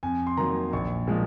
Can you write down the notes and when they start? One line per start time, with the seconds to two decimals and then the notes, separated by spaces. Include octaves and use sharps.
0.03 F2 G#5
0.27 C6
0.37 D#3 F#3 A#3 A#5
0.73 A#1 C#6
1.08 A#2 F3 G#3